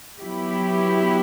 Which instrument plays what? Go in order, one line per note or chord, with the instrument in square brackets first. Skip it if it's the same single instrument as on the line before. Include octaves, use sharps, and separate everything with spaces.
[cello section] F#3 B3 E4 G4